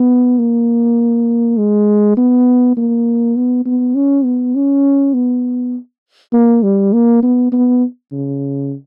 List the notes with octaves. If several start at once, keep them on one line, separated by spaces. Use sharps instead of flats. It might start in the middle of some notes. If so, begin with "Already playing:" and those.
Already playing: B3
A#3
G#3
B3
A#3
B3
B3
C#4
B3
C#4
B3
A#3
G3
A#3
B3
B3
C#3